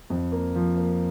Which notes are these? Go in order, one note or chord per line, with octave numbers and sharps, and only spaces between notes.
F2
A#3
F3
A#3